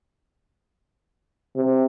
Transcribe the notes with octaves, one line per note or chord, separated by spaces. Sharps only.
C3